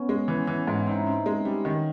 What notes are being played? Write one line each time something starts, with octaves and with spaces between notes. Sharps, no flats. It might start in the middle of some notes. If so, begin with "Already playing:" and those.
Already playing: B3 C#4
G#3
E3
E3
G#2
E4
C4 D#4
C4
G#3
G3
D#3